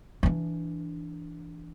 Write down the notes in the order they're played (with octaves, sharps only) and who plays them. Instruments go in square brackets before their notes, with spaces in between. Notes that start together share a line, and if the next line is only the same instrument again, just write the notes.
[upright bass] E3 D4